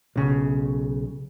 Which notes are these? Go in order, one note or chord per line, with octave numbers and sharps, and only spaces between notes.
B1 C#3